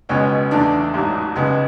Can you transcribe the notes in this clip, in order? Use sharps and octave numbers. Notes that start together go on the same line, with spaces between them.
C#2 B2 G#3 B3 C#4
E2 D3 A3 D4
A1 G#2 F#3
C#2 C#3 G#3 B3